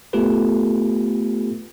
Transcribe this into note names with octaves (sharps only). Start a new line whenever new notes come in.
A3 B3 F4 G4 A4 B4